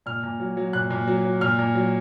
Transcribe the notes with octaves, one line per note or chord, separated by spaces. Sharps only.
A#2 F6
A#2
F#3
F#3
A#2 F#6
A#2
F#3
F#3
A#2 F6
A#2
F#3